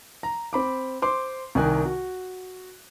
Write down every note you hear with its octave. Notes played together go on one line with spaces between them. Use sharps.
A#5
C4 B5 D6
C5 C6 D6
C2 D#3 A#4 G5 G#5 F#6
F#4